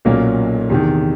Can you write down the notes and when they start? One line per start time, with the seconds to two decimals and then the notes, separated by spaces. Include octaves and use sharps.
0.05 B1 A#2 F#3 A#3 C#4
0.70 E2 C3 D#3